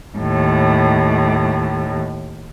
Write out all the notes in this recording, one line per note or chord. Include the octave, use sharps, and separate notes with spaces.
D#2 A2